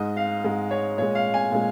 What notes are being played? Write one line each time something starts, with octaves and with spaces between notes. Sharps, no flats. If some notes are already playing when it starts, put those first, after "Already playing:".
Already playing: G#2 G#3 D#5
F5
G#2 G#3
C#5
A#2 G#3 C#5
F5
G#5
A#2 G#3